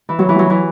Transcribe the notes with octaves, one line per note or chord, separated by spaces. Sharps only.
E3
F#3
E3
F#3
E3